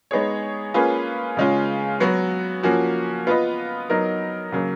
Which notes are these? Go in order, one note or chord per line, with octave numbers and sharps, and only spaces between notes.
G#3 B3 D#4 G#4 C#5
A#3 C#4 F4 G#4 B4
C#3 G#3 C#4 F4
F#3 B3 F#4
F3 A#3 C#4 F#4
B3 F4 B4 D#5
F#3 B3 D#4 A#4
C#3 F#3 A#3